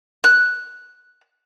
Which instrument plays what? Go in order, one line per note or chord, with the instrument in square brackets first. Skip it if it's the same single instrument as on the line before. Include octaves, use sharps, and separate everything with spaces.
[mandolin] F#6